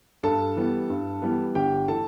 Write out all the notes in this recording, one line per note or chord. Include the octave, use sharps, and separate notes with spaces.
G2 A4 A5
E3 G3 B3
G2
E3 G3 B3
G1 G4 G5
E3 A3 A4 A5